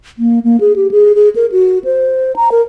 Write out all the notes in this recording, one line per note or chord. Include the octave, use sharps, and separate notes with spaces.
A#3
A#3
G#4
G4
G#4
G#4
A#4
F#4
C5
A#5
A#4